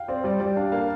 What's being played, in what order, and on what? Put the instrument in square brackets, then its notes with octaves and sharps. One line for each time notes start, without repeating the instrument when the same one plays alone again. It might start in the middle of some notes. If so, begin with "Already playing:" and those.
Already playing: [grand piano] F5 G5
[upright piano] C4 [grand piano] D5
[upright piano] G3 [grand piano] D5
[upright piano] G3 [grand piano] D5
[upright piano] D4 [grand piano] F5
[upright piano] A#3 [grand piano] F5